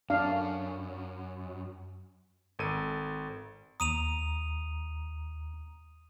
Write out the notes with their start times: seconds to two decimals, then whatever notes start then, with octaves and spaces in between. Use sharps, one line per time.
0.10 F#2 D4 F5
2.59 G#1 A4 D#7
3.80 D#2 A#5 D#6 D#7 F7